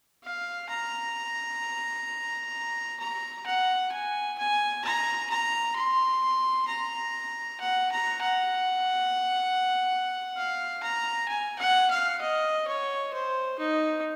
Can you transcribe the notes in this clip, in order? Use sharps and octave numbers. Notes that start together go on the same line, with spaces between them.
F5
A#5
A#5
F#5
G#5
G#5
A#5
A#5
C6
A#5
F#5
A#5
F#5
F5
A#5
G#5
F#5
F5
D#5
C#5
C5
D#4